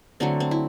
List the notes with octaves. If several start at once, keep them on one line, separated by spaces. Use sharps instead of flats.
D3 F#3 A3 C4
C4
E4